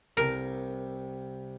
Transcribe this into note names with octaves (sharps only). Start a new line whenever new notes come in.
C2 C3 A#4